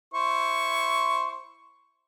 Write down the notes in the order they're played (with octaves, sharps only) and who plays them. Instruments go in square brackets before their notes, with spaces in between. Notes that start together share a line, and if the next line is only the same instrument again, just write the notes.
[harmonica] E4 C5 C#6